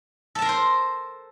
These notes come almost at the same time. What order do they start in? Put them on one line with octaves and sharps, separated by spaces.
A4 A5 A#4 C6 C5